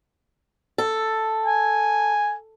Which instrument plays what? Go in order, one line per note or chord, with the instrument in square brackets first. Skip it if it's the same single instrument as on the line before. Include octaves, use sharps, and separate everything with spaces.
[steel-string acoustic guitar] A4
[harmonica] G#5